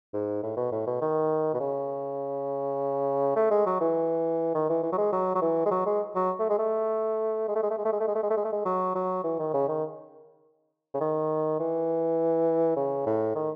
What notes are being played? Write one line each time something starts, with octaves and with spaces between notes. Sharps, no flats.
G#2
A2
B2
A2
B2
D#3
B2
C#3
A3
G#3
F#3
E3
D#3
E3
E3
F#3
G#3
F#3
F#3
E3
G#3
F#3
G#3
F#3
A3
G#3
A3
G#3
A3
G#3
A3
G#3
A3
G#3
A3
G#3
A3
G#3
A3
G#3
A3
G#3
F#3
F#3
E3
D#3
C#3
D#3
C#3
D#3
E3
C#3
A2
D#3